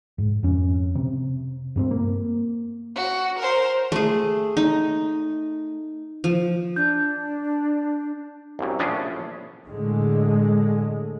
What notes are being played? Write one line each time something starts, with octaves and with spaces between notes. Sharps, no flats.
G#2
F2 C#4
C3
G2 A#3 C4
A#3
F#4
A#4 C5
A3 G#4
D#4
F3
D4 G6
C2 F#2
A#1 A2 C#4 D4 G#4
A2 D3 G#3